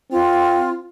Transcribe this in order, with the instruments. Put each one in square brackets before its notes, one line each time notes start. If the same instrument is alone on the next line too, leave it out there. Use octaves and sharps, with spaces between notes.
[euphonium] C4 [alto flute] F4